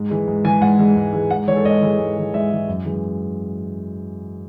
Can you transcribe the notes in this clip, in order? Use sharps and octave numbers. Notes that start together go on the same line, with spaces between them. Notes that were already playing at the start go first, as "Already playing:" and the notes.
Already playing: G#2
E3 G#3
G#2
E3 G#3 G#5
G#2 F#5
E3 G#3
G#2
E3 G#3
G#2 F#5
E3 G#3 C#5
A4
G#2 D#5
E3 G#3
G#2
E3 G#3
G#2 E5
E3 G#3
F#2
E3 G#3